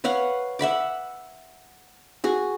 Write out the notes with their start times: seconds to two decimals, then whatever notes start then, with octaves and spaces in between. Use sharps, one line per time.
0.04 B4 C#5 F5 F#5
0.59 E5 F#5 B5 D6
2.24 F#4 G#4